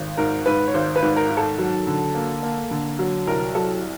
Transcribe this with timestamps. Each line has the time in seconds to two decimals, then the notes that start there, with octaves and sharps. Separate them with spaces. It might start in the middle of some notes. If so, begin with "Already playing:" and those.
Already playing: G#1
0.17 G#2 A#4
0.46 G#2 B4
0.68 C#5
0.74 G#1 C5
0.96 B4
1.02 G#2
1.16 A#4
1.30 D#3
1.37 A4
1.58 F#3
1.87 D3
2.15 A#3
2.43 A#3
2.71 D3
2.99 F#3
3.27 C2 A#4
3.55 F#3 A4